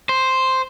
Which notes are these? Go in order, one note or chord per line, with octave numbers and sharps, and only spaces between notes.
C5